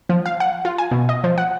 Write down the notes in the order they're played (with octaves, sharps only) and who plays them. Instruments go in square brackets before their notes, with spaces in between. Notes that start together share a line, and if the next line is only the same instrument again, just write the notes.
[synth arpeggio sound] F3
F5
F#5
F4
G#5
B2
D#5
F3
F#5